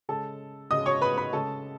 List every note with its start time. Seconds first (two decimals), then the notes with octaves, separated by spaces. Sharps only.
0.09 C#3 G#3 A4 A5
0.71 C#3 G#3 D#5 D#6
0.86 C#5 C#6
1.01 B4 B5
1.17 B4 B5
1.33 C#3 G#3 A4 A5